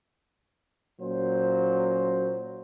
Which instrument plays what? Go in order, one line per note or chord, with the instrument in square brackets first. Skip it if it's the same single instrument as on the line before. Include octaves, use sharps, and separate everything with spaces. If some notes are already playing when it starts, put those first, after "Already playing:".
[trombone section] A#2 F#3 C#4 C5